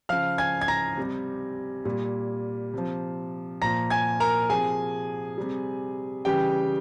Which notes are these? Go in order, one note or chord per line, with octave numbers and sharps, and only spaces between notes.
C#3 F3 F5 F6
G#5 G#6
G#6
A#5 A#6
C3 G3
A#2 G3
C3 F3
A#2 F3 A#5 A#6
G#5 G#6
A#4 A#5
C3 F3 G#4 G#5
C3 G3
C#3 E3 G3 G4 G5